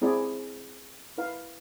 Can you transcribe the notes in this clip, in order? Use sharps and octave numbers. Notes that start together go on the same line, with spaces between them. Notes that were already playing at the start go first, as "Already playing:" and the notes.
C4 E4 G#4 D5
E4 B4 F5